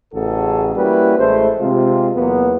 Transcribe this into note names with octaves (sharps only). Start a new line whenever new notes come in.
A1 C#3 F#4 G#4 A4
G3 A#3 C#4 E4 F#4 B4
A1 G#3 A3 C5
C3 G#3 F4
E2 F#3 A#3 B3